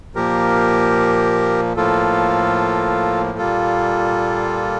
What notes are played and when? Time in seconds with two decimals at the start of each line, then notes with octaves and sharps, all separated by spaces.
0.15 A#2 F3 A#3 G4 A#4
1.76 A2 F3 A#3 F4 A4
3.38 A#2 G3 A#3 F4 A4